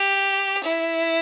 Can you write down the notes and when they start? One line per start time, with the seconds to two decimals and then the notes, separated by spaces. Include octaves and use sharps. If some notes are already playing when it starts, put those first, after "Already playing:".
Already playing: G4
0.64 E4